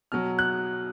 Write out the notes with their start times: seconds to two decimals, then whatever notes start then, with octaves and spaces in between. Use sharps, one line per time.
0.12 B2 F#3 F6
0.39 F#6